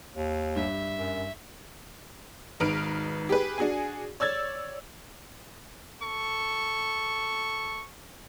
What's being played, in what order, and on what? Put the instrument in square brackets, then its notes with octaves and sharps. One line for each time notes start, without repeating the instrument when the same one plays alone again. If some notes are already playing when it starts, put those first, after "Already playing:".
[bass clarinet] D#2
[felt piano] G2 [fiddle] E5
[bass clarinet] F#2
[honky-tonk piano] G#1 D#4 B4 F6 D7
G4 G#4 B4
D4 F#4 G#4 G#5
C#5 D5 E6 G#6 A6
[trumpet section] A4 C#6